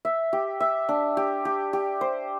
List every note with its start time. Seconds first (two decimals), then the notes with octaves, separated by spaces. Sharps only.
0.05 E5
0.33 G4
0.60 E5
0.89 D4
1.17 G4
1.45 G4
1.73 G4
2.01 C5